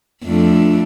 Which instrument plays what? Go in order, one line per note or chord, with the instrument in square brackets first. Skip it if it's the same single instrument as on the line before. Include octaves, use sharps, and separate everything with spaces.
[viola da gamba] F2 A3 D4